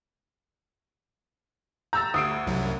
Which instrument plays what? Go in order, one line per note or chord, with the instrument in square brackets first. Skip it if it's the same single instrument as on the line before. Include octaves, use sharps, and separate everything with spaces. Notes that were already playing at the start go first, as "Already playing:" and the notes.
[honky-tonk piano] A#5 E6 A6 [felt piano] G6
[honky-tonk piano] D2 [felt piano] D#6 C7 D7
[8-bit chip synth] C2 F#2